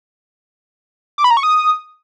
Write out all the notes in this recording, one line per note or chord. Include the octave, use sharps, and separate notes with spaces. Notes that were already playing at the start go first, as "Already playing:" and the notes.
D6
B5
A#5
C#6
D#6